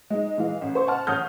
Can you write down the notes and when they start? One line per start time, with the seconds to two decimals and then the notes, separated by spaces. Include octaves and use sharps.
0.10 G#3 D#4
0.38 E3 G#3 F5
0.61 A1
0.75 C5 C#6
0.87 F#5 A5 F6
1.07 A1 C#4 D#6 F6 G6